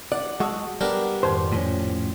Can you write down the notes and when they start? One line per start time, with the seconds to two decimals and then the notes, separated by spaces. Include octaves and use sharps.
0.12 D5 F#5
0.40 G#3 F#4 A5 D#6 E6
0.81 G3 B3 D4 G4 A#4
1.23 F2 G#2 D#3 C5
1.53 A2 F3 C#4